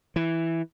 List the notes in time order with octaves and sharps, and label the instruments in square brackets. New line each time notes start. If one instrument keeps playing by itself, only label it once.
[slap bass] E3